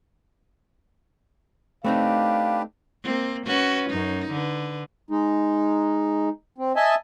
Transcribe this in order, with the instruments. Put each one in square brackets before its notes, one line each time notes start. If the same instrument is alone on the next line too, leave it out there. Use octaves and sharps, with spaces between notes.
[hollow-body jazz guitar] A3 C4 D#4 [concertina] D4 G4 B4 [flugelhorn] F5
[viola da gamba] A#3 C4
C#4 F#4 B4
F#2 D#4
D3 B4
[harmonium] G#3 D#4
C4
D#5 E5 G#5 A5